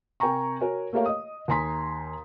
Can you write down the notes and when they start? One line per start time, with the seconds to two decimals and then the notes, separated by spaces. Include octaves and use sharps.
0.20 C3 A#4 G5 G#5 A#5 C#6
0.61 F#4 A#4 C#5 G#5
0.93 A3 A#3 G4 A#4 C#5 F5
1.06 D#5 D#6
1.48 D#2 G#5 A#5 C6 B6